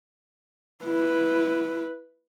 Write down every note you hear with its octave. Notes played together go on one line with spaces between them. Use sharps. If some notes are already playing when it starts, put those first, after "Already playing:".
E4 B4